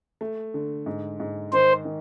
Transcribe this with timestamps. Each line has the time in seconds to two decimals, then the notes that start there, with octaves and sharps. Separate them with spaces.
0.21 A3
0.54 D3
0.86 G#2
1.20 G#2
1.53 D#3 C5
1.85 D#3